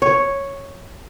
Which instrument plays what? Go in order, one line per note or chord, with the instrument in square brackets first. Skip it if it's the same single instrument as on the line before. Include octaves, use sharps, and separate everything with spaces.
[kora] C#5